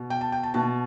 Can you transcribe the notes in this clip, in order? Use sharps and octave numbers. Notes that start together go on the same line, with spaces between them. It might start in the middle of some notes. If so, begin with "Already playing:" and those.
Already playing: B2
G5
A5
G5
A5
B2 A5